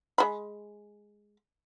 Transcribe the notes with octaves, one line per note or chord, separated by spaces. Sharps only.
G#3 B5